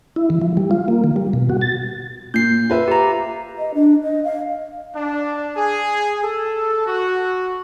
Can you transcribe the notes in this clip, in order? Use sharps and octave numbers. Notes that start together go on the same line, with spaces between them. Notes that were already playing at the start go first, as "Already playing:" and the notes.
E4
E3
F3
G3
F4
A#3
D#3
G3
B2
F#4
A6
A#2 G6 C7
F4 B4 E5
G4 A#5
D#5
D4
D#5
F5
D4
G#4
A4
F#4